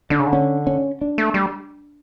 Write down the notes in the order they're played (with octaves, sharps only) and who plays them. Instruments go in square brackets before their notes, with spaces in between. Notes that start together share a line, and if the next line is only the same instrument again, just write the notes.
[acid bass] D3 [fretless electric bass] D4
[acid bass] C#3
D3
[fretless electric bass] C#4
C#4
D4
[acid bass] A3
G3